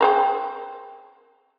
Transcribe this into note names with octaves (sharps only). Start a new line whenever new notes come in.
C4 G#4 A#4